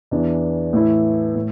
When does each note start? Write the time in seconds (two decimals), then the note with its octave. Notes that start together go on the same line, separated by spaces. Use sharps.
0.11 E2 E3 D4
0.73 A2 E3 A3 E4
1.35 A2